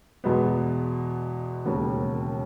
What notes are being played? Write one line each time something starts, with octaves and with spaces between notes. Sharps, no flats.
E2 B2 G#3 B3
E1 D#2 C#3